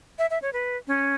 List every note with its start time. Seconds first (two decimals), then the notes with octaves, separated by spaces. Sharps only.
0.19 E5
0.30 E5
0.42 C#5
0.53 B4
0.87 C#4